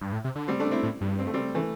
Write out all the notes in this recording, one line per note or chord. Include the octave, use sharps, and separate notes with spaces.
G2
A2
C3
D3
G3 C4
A3 D4
C4 E4
A2
G2
C4
A3
G3 C4
E3 A3